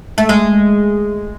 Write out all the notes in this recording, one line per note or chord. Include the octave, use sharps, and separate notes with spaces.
A3
G#3